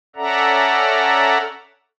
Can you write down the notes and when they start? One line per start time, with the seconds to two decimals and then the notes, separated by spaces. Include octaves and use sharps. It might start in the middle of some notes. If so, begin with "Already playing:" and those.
0.16 C#4 A4 D5 E5 F#5 A#5